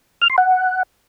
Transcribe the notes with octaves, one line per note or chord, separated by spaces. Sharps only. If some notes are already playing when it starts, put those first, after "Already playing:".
F6
C6
F#5